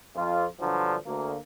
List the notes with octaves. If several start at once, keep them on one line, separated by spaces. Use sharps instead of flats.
F2 F4
G2 D3 F3 F#3
D2 A#3